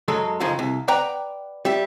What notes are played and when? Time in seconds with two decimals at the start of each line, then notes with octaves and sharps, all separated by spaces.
0.08 F#2 F#3 G#3 A4
0.40 C#2 F#2 D#3 F3 G#3
0.59 C2
0.88 B4 D5 F#5 G5 A#5
1.65 G3 E5